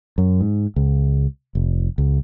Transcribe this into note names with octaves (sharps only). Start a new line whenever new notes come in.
F#2
G#2
C#2
F1
C#2